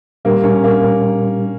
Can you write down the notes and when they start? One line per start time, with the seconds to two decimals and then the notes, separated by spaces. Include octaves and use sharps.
0.25 A#2 G3 A#3 D4 G4 A#4
0.44 C#4
0.64 A#3